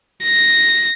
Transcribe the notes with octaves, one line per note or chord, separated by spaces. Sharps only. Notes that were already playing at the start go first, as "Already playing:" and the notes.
A#6